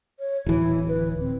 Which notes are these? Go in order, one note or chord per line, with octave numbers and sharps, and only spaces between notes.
C#5
D1 E3 E4
B4
C4